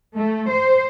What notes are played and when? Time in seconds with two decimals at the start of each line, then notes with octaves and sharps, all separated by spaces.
0.17 A3
0.49 C5